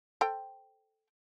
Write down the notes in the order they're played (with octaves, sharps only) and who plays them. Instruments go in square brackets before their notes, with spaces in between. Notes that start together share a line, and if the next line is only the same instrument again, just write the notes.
[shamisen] A4 C5 G5